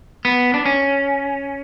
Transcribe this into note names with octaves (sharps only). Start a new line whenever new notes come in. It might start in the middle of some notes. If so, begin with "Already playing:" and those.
B3
D4
C#4